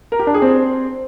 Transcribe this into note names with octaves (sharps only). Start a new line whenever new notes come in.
A#4
G4
D4
G#4
C4